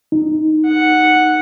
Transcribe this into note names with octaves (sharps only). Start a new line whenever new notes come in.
D#4
F#5